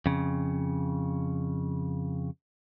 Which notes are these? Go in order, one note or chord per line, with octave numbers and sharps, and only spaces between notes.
F2 C#3